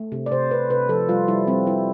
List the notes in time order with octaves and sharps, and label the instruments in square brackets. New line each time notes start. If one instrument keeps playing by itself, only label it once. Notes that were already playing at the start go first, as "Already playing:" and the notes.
Already playing: [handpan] A3
C3
D5
C3 C5
C3 B4
C3 B4
F3 A4
G3 F4
G3 E4
G3 C4
G3 E4